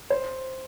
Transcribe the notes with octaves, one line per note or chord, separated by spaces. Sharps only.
C5